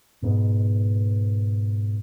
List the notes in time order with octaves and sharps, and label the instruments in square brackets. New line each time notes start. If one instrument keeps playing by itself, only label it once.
[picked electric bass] G#2 B2